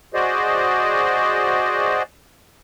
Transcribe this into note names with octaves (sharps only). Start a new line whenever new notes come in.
F#4 G#4 C5 D5 D#5